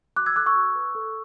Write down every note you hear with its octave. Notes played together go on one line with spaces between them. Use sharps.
F#4 D6 F#6
E6 G#6
A4 D6 F#6
C#6 E6
F#4
B4
A4